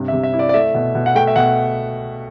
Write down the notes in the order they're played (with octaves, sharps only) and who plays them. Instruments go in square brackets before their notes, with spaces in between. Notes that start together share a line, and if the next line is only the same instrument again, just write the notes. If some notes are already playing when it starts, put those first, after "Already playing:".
Already playing: [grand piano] G2 C3
E5
C3
E5
E4
D5
D5
A3 E5
B2
B2
F#5
A3 G5
E5
B2 F#5